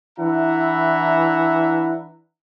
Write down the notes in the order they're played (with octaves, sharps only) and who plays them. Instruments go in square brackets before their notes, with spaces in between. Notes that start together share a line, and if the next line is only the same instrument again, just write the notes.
[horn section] E3 D4 E4 E5 F#5 A#5